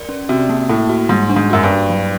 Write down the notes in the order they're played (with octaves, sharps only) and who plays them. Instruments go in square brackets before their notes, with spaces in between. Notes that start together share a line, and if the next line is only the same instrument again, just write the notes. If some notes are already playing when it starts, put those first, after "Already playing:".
Already playing: [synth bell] A#4 D5
C#4
[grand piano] C3 [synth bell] F#4
[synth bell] A#3
[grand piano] A2 [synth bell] A#3
[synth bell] F#4
[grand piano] G#2 [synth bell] G3
[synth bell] D4
[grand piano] G#2
[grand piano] F#2 [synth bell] F#4
[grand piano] G2
[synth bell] D4
F#3